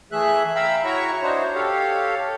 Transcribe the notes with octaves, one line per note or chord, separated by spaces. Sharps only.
E3 A3 G#4 E5 F#6
E5 F5 G5 A#5 B5 E6
E4 F#4 C#5 E5 A#5 C#6
D4 D#4 F#4 C5 C#5
G4 A4 C#5 F5